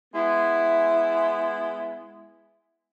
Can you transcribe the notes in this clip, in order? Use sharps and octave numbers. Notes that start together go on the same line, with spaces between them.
G#3 B3 E4